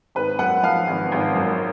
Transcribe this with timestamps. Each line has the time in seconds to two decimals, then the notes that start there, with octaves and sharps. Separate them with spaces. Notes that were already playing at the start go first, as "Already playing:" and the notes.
0.15 G#1 B4
0.39 F#2 F#5
0.63 F3 F5
0.88 G#1
1.12 G#1
1.35 F#2